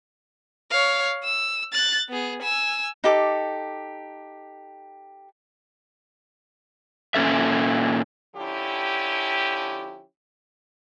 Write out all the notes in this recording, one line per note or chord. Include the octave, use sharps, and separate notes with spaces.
C#5 F5
E6
F#6 A6
B3 G#4
G#5 E6
D#4 G4 A4 D6
A#2 C#4 A4 E5
D3 F3 C#4 E4 G4